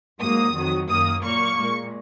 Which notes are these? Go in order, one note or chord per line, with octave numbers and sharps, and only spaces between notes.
G#2 F#3 A#3 D#6
F2 D#3 F#3
F#2 D#3 A#3 D#6
A#2 F#3 A#3 C#6
A#2 G#3